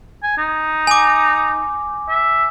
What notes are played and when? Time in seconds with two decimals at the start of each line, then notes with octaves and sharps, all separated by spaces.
0.23 G#5
0.38 D#4
0.87 G#5 D6
2.09 E5